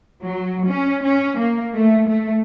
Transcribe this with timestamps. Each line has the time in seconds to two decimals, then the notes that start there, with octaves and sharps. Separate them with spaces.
0.22 F#3
0.67 C#4
1.04 C#4
1.38 A#3
1.74 A3
2.08 A3